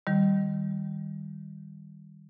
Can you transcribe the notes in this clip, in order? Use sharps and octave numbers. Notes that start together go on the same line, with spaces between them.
D#3 G3